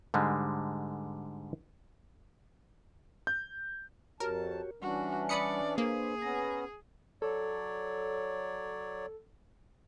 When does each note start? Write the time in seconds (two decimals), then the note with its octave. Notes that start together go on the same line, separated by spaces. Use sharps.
0.14 G#2 D3 G3 G#3
3.27 G6
4.20 F2 F#4 G4 A#4 C#5 A5
4.82 E3 G3 C#4 D4 F#4 F#5
5.29 D5 B5 D#6 C#7
5.78 A#3 D4 G#4 B4 C5
6.22 B3 C#4 A#5 A#6
7.22 F#3 A4 C#5 D5